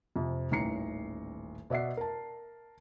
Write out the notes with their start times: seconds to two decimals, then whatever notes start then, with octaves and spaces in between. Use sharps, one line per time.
0.16 F2 C3
0.51 D#1 A1 D#3 A#5 C7 C#7
1.70 B2 D5 E5 F#5 C7
1.97 A#4 A5